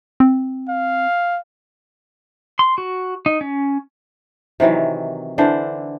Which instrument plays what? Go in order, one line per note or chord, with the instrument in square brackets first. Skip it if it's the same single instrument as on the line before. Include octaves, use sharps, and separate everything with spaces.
[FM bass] C4
[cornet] F5
[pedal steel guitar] C6
F#4
D#4
C#4
[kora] C3 D#3 E3 F#3
D3 E3 D4 C5